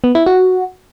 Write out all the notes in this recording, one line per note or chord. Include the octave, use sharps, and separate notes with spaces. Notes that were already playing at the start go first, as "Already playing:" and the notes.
B3
E4
F#4